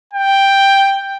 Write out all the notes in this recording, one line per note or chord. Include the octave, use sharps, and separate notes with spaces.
G5